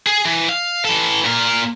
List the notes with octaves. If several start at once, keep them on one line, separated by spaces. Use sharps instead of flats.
G#4
E3
F5
E3 A4
A#2 A#4